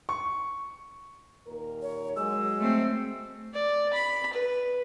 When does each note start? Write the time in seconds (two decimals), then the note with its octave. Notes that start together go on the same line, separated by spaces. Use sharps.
0.09 C#6
1.47 D#2 A#2 A#4
1.82 C#5
2.16 F#3 G#3 E6
2.60 A3 C4
3.53 D5
3.93 B5
4.33 B4